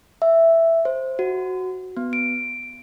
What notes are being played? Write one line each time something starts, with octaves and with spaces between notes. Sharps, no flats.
E5
C5
F#4
B3
D7